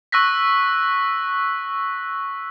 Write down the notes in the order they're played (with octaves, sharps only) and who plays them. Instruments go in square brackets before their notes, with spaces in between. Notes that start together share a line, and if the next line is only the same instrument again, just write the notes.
[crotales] C#6 E6 F#6 A#6 B6